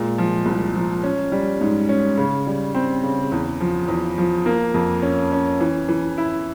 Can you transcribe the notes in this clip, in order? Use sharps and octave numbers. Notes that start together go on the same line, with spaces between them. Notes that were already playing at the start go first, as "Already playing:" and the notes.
Already playing: A#2 G#3
F3
C2
F3
C#4
G3
G#2
C#4
C#3
G3
C4
C#3
E2
F3
E2
F3
A#3
F2
C#4
C#4
E3
E3
E4